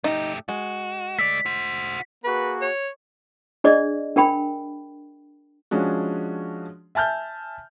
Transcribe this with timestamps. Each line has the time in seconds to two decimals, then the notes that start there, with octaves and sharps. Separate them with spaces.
0.04 A3 D#4 G4
0.49 G#3 F#4
1.19 A3 D5 B6
1.46 F#4 C5
2.24 A#3 F#4 G#4 B4
2.61 C#5
3.64 D4 G#4 D5 D#5
4.16 D4 A#4 G5 B5
5.71 F3 G#3 C#4 D4 F#4
6.95 E5 G#5 A5 F6 G6